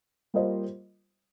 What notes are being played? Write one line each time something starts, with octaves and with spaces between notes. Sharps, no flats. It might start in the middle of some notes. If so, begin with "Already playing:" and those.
G3 A#3 F4 C5 D#5